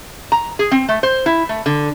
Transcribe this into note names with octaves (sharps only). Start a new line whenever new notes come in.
A#5
G#4
C4
A3
C5
E4
A3
D3